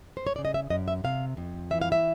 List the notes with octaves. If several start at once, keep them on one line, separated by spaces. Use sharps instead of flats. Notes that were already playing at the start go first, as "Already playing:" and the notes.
C5
C#5
C#3 D5
D#5
E5
F#2 D#5
E5
C3 F5
F2
E3 E5
F5
E5